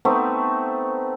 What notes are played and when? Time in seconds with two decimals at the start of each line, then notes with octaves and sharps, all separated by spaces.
0.05 A3 B3 C4 D#4